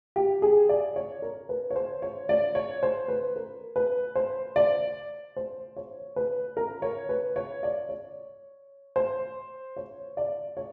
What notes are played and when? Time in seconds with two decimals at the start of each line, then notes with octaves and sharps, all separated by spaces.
0.16 G4
0.42 G#4
0.69 D5
0.96 C#5
1.22 A#4
1.49 B4
1.70 C#5
1.76 C5
2.02 C#5
2.29 D5
2.55 C#5
2.83 C5
3.08 B4
3.36 A#4
3.76 B4
4.16 C5
4.56 D5
5.37 C5
5.76 C#5
6.16 B4
6.57 A#4
6.82 C#5
7.09 B4
7.36 C#5
7.63 D5
7.89 C#5
8.96 C5
9.76 C#5
10.17 D5
10.57 C#5